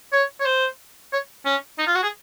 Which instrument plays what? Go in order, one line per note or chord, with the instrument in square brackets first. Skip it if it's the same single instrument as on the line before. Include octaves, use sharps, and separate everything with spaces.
[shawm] C#5
C#5
C5
C#5
C#4
D#4
F4
F#4
G#4